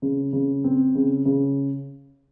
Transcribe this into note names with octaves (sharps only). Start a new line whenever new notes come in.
C#3
C#3
C4
C#3
C#3